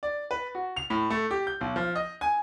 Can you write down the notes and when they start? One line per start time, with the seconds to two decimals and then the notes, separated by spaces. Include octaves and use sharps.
0.03 D5
0.31 B4
0.55 F#4
0.76 F7
0.90 A2
1.10 A3
1.31 G4
1.47 G6
1.61 B1
1.76 F3
1.95 D#5
2.21 G#5